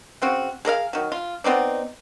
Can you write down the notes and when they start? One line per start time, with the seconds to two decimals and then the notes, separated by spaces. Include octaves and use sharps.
0.22 C#3 C4 F#4
0.65 G#4 A#4 D#5 F5
0.93 D#3 F#3
1.12 F4
1.44 B3 C4 D#4 D5